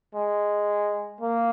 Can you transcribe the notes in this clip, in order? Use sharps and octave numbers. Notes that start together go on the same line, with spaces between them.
G#3
A#3